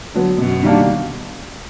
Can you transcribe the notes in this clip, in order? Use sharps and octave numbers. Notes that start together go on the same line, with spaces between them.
D3 F#3 B3
F#2 B2
D#3 G3 A#3 D4